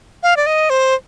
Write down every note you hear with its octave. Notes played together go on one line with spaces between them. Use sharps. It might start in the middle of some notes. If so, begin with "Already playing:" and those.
F5
D5
D#5
C5